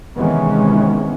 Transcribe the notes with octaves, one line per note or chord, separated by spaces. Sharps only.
C3 D#3 E3 G#3 B3 C#4